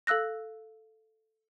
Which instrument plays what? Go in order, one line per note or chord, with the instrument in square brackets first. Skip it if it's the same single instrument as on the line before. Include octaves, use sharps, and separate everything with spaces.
[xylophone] A4 F5 E6 F#6 A#6